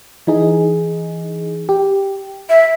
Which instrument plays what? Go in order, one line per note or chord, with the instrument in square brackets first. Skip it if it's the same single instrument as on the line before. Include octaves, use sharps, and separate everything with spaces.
[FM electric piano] E3 D#4 G#4
G4
[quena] E5